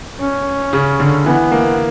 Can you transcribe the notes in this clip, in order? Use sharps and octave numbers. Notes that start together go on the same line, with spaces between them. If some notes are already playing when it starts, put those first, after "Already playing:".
C#4
C#3
D3
E3 B3
A#3